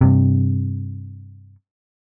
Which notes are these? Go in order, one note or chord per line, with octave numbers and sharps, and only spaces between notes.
G2 C3